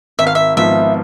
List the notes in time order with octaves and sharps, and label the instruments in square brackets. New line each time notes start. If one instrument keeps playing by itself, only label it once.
[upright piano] G#1 [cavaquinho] E5
[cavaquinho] F5
E5
[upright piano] G#2 F3 B3 F4 [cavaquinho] E5